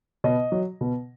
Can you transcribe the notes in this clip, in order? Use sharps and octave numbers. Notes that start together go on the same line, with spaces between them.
B2 D#5
F#3
B2